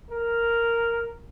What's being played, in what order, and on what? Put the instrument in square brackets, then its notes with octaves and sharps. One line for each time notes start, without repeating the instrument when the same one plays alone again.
[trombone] A#4